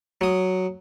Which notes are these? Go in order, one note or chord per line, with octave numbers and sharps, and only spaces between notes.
F#3 D#6